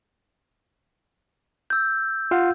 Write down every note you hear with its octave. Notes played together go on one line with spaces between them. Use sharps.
E6 G6
F4 F5 F#5